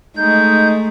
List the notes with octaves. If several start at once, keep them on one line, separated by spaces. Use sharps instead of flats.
G#3 A3 D#4 G6